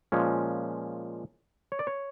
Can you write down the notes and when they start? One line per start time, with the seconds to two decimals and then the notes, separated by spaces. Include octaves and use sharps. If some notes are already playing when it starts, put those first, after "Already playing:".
0.12 A#2 F3 G#3 C#4
1.72 C#5
1.79 D5
1.87 C#5